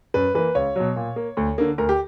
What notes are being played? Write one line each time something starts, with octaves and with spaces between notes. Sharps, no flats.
F#2 B4
E3 A#3 B4
C#2 C#5
B2 F#3
A#2
A#3
D2
D3 A#3
D2 A#4
G4